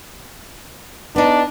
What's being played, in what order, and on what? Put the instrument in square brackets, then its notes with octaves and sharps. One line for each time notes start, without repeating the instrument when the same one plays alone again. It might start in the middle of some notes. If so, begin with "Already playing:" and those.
[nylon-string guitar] B3 D#4 [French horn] D4